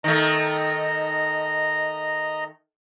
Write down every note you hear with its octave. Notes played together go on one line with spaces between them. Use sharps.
D#3 A3 D#5 A#5